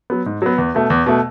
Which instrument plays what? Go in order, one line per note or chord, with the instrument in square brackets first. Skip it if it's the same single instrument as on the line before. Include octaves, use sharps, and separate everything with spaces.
[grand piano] F#3 B3
G#2
F#3 B3
E2
B2 A3
E2
B2 A3